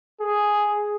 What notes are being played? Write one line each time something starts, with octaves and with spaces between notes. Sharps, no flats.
G#4